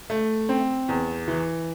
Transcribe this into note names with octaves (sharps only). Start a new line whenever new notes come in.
A3
C4
E2
E3